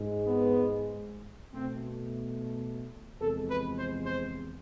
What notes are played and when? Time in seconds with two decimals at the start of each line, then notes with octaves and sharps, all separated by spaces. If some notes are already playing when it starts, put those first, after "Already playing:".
Already playing: G#2 G#3
0.26 B3
1.53 B2 A3 C4
3.21 E2 C3 F3 G#3 A4
3.49 B4
3.78 C5
4.06 C5